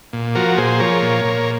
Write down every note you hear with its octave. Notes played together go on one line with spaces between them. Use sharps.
A#2
F3 F#4 A#4
A#2 G#4 C5
F3 A#4 C#5
A#2
A#2